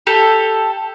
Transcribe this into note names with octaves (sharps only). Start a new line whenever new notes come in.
G4 A4